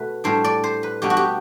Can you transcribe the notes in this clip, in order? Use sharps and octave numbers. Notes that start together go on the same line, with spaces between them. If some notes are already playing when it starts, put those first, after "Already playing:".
Already playing: B2 A3 B4
A2 G3 D4 C5
D5
C5
B4
B2 G3 B3 D4 G4
F#4
G4